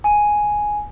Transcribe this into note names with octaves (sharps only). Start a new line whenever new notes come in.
G#5